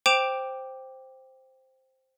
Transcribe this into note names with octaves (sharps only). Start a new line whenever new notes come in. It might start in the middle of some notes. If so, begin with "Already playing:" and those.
C5 G5 D6 D7 E7 F7